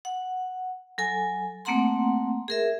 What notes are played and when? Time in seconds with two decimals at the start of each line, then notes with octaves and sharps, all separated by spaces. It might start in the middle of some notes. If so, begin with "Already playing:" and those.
0.05 F#5
0.98 F#3 A4 G#5
1.65 A3 A#3 C4 F#5 A#5 C6
2.48 G#4 A#4 E5